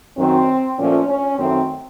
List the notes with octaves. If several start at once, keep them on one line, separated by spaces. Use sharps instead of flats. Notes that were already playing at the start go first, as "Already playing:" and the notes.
F#2 D#3 F#3 C4
A#2 F3 A3 C#4
C#4
F#2 D#3 A3 C4